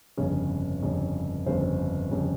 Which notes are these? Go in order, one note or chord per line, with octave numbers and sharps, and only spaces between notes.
G1 F2 C#3 C#5
G1 F2 C#3
G1 F2 C#3 C5
G1 F2 C#3